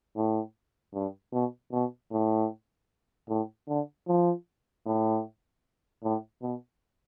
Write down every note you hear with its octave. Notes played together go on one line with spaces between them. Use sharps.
A2
G2
B2
B2
A2
A2
D3
F3
A2
A2
B2